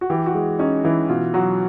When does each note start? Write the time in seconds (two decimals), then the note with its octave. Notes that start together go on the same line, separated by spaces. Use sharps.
0.01 F#4
0.10 E3 G4
0.26 F#4
0.34 G#3
0.59 C#4 D#4
0.84 E3 E4
1.09 B2 F4
1.34 F#3 F#4